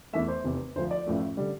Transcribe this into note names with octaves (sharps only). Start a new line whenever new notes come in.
E2 E3 A3 E5
C5
F1 E2 C3
D2 D3 F3 C5
D5
A1 A2 F3 A3
D3 G3